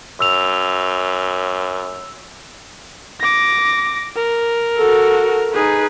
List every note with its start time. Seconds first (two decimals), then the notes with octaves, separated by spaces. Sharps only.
0.21 F#2 E6 F7
3.20 D6 A#6
4.16 A#4
4.77 F#4 A4
5.53 D#4 G#4 B4